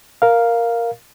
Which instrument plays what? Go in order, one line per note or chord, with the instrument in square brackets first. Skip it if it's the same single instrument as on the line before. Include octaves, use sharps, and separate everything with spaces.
[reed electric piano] A#4 F5